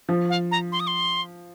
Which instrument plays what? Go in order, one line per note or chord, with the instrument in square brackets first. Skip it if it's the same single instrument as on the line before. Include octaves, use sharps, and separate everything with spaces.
[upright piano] F3
[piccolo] F5
A#5
C6
D#6
C6